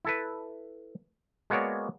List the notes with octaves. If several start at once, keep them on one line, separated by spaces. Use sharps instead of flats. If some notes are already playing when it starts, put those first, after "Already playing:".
E4 A4 B4
G#3 A#3 B3 F#4 C#5 D5